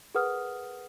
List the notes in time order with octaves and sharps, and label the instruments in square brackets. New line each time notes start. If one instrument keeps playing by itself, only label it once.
[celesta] G#4 A#4 B4 F#5 D#6 F6